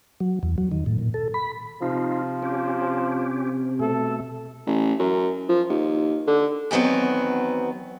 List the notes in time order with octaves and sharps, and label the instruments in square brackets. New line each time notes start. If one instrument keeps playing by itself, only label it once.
[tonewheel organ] F#3
E2
F#3
D#3
A2
A#2
A4
B5
[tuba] C3 [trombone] F3 [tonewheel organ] D#4 F4
[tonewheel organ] C#4 G4
[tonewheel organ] B2 A3 [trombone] A4
[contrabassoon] A1
F#2
F3
D#2
D3
[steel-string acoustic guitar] E2 D#3 F#3 B3 C4